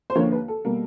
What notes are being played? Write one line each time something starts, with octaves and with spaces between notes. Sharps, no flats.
C5
D#2 D3 F3 A#3 C#5
B4
A4
B2 G3 A#3